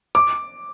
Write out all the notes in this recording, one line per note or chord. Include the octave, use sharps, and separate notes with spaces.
D6